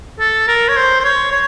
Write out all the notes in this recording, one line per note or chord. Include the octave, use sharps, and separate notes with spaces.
A4
A#4
C#5
C5
C5
C#5
C#5